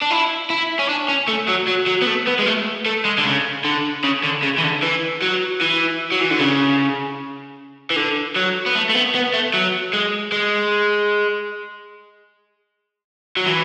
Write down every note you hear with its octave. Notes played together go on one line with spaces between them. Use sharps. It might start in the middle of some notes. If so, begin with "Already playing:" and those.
D4
E4
E4
C#4
D4
C#4
A3
F#3
F#3
F#3
B3
A3
B3
G#3
A3
A3
G#3
D3
C#3
D3
C#3
D3
C#3
E3
D3
E3
F#3
E3
F#3
E3
D3
C#3
E3
D3
F#3
B3
A3
A3
B3
B3
A3
F#3
G#3
G#3
F#3
E3